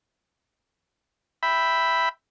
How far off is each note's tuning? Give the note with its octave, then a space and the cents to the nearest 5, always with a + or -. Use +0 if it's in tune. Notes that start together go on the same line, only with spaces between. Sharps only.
E5 +0 G5 +0 B5 +0